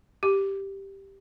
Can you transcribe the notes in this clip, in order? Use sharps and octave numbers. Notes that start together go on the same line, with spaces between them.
G4